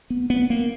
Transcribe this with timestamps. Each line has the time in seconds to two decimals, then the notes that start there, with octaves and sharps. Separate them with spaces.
0.10 B3
0.30 B3
0.50 A#3